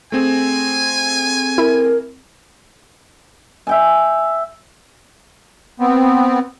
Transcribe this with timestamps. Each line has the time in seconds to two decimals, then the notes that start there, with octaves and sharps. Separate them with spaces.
0.12 A3 C4 G#4 G#5
1.58 E4 A#4
3.67 E5 G5 G#5
5.80 B3 C4